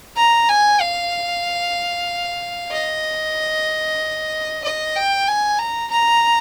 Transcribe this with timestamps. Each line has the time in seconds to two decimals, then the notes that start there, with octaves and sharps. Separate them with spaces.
0.17 A#5
0.49 G#5
0.80 F5
2.71 D#5
4.64 D#5
4.96 G5
5.27 G#5
5.58 A#5
5.90 A#5